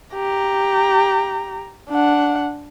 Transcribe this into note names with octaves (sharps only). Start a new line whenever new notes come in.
G4 A#5
D4 F#5